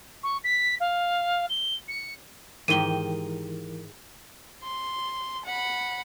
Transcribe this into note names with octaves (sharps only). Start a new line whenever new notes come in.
C#6
B6
F5
G7
C#7
G#2 D#3 E3 E4 G4 A#4 D#7 G7
C6
F#5 B5